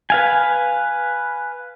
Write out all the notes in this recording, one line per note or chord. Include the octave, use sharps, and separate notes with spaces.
B4 F5 G#5